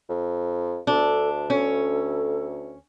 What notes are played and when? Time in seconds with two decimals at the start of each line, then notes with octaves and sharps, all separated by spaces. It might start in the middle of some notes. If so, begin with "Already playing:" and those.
0.09 F2
0.87 D2 D4 A4
1.50 C#4 A4